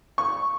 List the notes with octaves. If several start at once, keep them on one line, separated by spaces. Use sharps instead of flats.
C#6